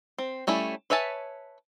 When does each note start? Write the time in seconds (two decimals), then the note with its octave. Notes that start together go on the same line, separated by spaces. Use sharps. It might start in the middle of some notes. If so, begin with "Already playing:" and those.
0.18 C4
0.47 G3 A3 C#4 E4
0.90 B4 C#5 E5 G#5 A5